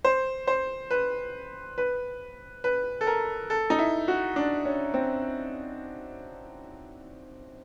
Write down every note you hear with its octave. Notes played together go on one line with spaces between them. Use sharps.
C5
C5
B4
B4
B4
A4
A#4
A4
D#4
E4
F#4
D4
C#4
C4